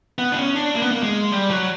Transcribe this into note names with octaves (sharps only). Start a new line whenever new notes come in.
B3
D4
C#4
D4
A#3
B3
A#3
G#3
G3
F#3